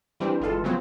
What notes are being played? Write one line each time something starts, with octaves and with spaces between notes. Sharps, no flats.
E3 G3 C4 D4
G1 E3 G#3 F4 A4
C#3 F3 F#3 B3 C4